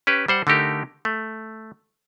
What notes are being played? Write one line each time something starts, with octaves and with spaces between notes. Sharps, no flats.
C#4 G4 B4
G3 C5 F#5
D3 A3 D#4 G4 A#4
A3